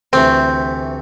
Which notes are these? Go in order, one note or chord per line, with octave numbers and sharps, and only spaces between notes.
D2 C3 E3 A3 C4